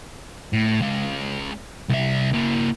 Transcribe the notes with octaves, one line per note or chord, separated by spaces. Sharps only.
A2
G#3 C#4
C2 E5
A#3 E4